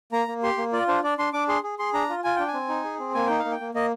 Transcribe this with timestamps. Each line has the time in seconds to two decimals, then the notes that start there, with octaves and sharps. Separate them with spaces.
0.12 A#3 A#5
0.28 A#3
0.43 G4 C6
0.58 A#3
0.73 F4 D5
0.88 D4 C5
1.04 D4 D5
1.18 D4 C6
1.33 D4 D6
1.48 G#4 C6
1.63 G#4
1.79 G#4 C6
1.94 D4 A#5
2.09 F4
2.24 F4 G#5
2.36 D4 G5
2.48 G#5
2.54 C4
2.69 D#4
2.84 G#4
2.99 C4
3.14 A#3 G#5
3.27 D#4 G5
3.39 F5
3.45 A#3
3.51 G5
3.60 A#3
3.74 A#3 D#5